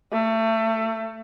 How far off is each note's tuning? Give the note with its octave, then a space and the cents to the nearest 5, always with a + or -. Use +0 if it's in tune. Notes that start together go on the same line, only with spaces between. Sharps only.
A3 +25